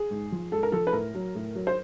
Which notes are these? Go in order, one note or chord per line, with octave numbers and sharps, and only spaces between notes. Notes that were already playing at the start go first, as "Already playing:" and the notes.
Already playing: G#4
G#2
F3
G#2 A4
A#4
F3 A4
B4
A2 A#4
F#3
A2
F#3
C5